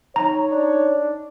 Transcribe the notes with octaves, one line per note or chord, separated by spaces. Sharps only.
D#4 C#5 A#5
D4